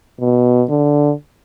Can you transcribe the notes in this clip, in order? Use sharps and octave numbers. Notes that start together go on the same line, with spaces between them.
B2
D3